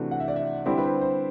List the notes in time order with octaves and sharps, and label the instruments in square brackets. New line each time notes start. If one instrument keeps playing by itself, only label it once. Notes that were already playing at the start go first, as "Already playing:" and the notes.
Already playing: [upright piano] C3 E3 A3 D4 F#4
[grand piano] F#5
E5
D5
E5
[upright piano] D3 G3 C4 E4 G4 [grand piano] D5
[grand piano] B4
C5
C5